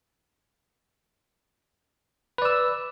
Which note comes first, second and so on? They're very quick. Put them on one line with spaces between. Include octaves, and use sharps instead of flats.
B4 D5 E6